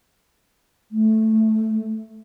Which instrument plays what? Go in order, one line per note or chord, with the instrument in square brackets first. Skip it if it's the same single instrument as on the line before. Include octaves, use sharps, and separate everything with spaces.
[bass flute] A3